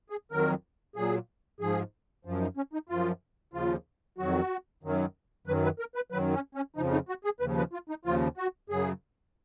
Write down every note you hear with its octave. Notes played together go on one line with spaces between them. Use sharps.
G#4
F2 D#3 F#3 A#4
A#2 F#3 G#4
G#2 F3 G#4
F#2 F3
D#4
C#4
D#4
F#2 F3 F4
D#2 C#3 F3 F4
F2 D#3 F#3 F#4
F#2 D#3 F#3
F#2 D#3 F#3 B4
B4
A#4
B4
F#2 D#3 F#3 B4
C#4
C#4
F2 C#3 F3 D#4
D#4
F#4
G#4
D#2 C#3 F3 B4
B4
F4
D#4
D#2 C#3 F3 F4
F#4
F#2 C#3 F#3 G#4